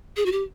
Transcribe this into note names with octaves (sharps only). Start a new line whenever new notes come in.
G#4
F#4
G4